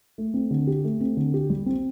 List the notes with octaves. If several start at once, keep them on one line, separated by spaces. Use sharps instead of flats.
A3
C4
D3
G4
A3
C4
D3
G4
G3
C4